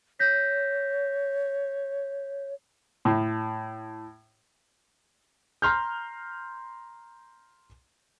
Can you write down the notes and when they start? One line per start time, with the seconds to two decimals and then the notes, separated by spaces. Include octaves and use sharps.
0.19 C#5 G6 A#6 B6
3.05 A2
5.62 A#5 C6 F6 G6